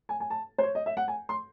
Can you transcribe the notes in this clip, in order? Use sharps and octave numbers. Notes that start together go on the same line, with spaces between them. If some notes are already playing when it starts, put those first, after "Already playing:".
G#5
G#5
A5
C5
C#5
D#5
E5
F#5
G#5
C6